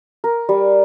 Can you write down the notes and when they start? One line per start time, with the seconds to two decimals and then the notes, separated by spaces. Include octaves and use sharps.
0.24 A#4
0.49 G3